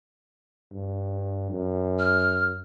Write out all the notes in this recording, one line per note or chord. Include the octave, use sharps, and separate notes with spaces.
G2
F#2
F6